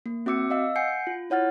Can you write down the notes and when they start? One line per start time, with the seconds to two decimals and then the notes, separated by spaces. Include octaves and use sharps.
0.06 A#3
0.26 C4 F#4 E5 D6 E6 C#7
0.50 D#5 F5 E6
0.76 F#5 G#5 G6 C7 C#7
1.07 F4
1.30 E4 C#5 F#5 F6 A6